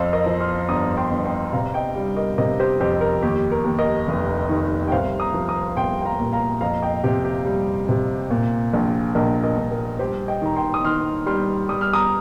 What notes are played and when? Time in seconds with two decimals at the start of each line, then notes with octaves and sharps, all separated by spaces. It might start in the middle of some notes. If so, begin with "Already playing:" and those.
Already playing: F2 C5 F5
0.13 A#4 D#5
0.26 F3
0.41 C6 F6
0.69 G1 A#5 D#6
0.97 G5 C6
1.11 G1
1.25 G5 C6
1.53 C3 F5 A#5
1.74 D#5 G5
1.96 G3
2.17 A#4 D#5
2.38 C3 A#4 D#5
2.60 G4 C5
2.80 F2 G4 C5
3.01 A#4
3.23 D#2 G4
3.52 A#4
3.65 D#2
3.79 A#4 D#5
4.08 F1
4.49 D#3
4.88 G5
4.92 C2 C5 F5
5.20 A#5 D#6
5.34 F3
5.48 A#5 D#6
5.77 C2 G5 C6
6.01 G5
6.05 F5 A#5
6.19 A#2
6.32 F5 A#5
6.61 F2 F5 A#5
6.82 D#5 G5
7.04 C3 G4
7.24 G4
7.46 G3
7.89 C3
8.30 A#2
8.74 A#1
9.15 A#1 A#4 D#5
9.43 A#4 D#5
9.58 A#1
9.71 A#4
9.99 G3 G4 C5
10.28 D#5 G5
10.42 D#3 A#5
10.56 G5 C6
10.74 D#6
10.84 D#3 C6 F6
11.26 G3 C6 F6
11.69 G3 D#6
11.81 F6
11.93 A#5 D#6